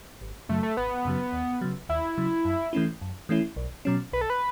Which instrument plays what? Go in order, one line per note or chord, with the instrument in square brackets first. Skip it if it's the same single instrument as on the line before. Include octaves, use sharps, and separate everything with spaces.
[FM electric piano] G#1
[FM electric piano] F#2 C#3 F#3 [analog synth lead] A3
[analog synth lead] A3
[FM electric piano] G#1 [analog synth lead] B3
[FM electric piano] F#2 C#3 F#3
D#2
C#3 F#3
[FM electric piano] D#2 [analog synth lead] E4
[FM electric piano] C#3 F#3
F#2
E3 A3 C#4 E4
F#2
E3 A3 C#4 E4
B1
B2 F#3 C#4
[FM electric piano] B1 [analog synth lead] B4
[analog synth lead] A4
B4